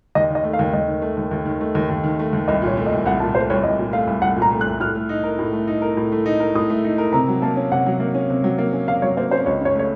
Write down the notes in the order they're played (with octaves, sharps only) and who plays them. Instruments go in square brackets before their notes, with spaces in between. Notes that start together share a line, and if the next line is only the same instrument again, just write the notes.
[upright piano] D#2 [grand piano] D#5
[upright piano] D#3 [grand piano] D#5
[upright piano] A3
[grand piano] F5
[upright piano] D#2
[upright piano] D#2 [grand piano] D#5
[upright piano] D#3
A3
D#2
D#2
D#3
A3
D#2
D#2
D#3
A3
D#2
[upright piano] C2 [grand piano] D#5
[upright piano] A#2
[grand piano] C#5
[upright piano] A3
[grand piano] D#5
[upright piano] C2
[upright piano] C2 [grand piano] F#5
[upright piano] A#2 [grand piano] A5
[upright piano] A3 [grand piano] C5
[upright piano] C2 [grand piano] C#5
[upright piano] C2 [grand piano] D#5
[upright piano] A#2
[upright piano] A3 [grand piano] F5
[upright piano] C2
[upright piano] C2 [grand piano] F#5
[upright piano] A#2
[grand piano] A#5
[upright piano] A3
[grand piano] F#6
[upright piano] C2
[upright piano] A2 [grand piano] F6
[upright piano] A3
D#4
A#4
A2
A3
D#4
A#4
A2
A3
D#4
A#4
[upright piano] A2 [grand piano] D#6
[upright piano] A3
D#4
A#4
[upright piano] C3 [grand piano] A#5
[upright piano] F#3
[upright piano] A#3 [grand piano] A5
[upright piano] C#4
[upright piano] C3 [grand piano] F#5
[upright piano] F#3
A#3
C#4
C3
F#3
A#3
C#4
[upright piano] C3 [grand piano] F5
[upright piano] F#3 [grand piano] C#5
[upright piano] A#3 [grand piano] C5
[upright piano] C#4 [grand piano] C5
[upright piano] C#2 [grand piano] C#5
[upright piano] C#3 [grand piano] C#5
[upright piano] A3 [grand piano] C#5